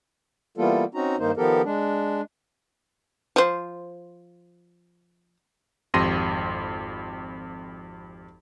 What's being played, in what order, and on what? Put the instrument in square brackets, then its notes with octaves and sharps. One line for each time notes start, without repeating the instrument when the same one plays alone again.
[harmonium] E3 G3 A#3 B3 F4 A4
C4 C#4 D#4 F#4 A#5
G2 D#3 A#3 D#4 C5
D#3 F3 B3 G4 A4 A#4
G#3 D4
[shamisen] F3 C5
[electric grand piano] G#1 F2 G4 C6 A#6 D#7